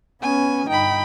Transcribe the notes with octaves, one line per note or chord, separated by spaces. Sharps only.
B3 C#4 G#5
G1 D#4 G5 B5